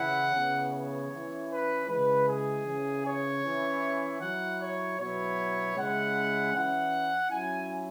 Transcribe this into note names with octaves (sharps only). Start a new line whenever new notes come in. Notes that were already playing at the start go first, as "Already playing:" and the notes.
Already playing: C#3 E3 C#4 E4 F#5
C#3 E3 B3
C#5
E3 C#4 E4
B4
C#3 E3 G#3 B4
G#4
C#3 E3 C#4
C#5
E3 C#4 E4
F#3 E4 F#5
C#5
B2 F#3 B3 E4 C#5
C#3 G#3 C#4 E4 F#5
E3 C#4 E4 F#5
F#3 C#4 E4 G#5